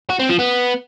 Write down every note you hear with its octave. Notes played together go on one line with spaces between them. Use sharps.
F#4
C4
F3
B3